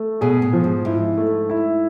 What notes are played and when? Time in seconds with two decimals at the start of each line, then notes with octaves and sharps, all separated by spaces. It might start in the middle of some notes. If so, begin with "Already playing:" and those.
Already playing: A3
0.21 B2 G#4
0.42 A2
0.53 F3
0.64 G#2
0.85 G#2 E4
1.17 A3
1.50 E4